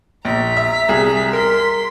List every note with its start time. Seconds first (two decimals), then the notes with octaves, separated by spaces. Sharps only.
0.25 A#1 A#5 B6
0.57 E5
0.89 C2 G#4
1.33 A#4 C6 B6